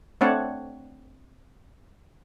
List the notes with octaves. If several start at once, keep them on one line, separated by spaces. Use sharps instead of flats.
A3 C4 D4 C#5 F#5 A5